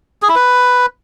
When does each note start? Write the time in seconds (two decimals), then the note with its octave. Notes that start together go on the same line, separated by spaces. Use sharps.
0.22 G#4
0.29 E4
0.36 B4